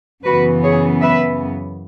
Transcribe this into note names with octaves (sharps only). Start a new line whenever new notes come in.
F#2 C#3 E3 B3 F#4 B4
G#4 C#5
B4 E5